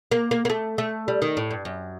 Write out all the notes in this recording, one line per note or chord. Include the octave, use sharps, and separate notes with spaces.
A#3
A#3
A#3
A3
A3
G3
D#3
A2
G2
F#2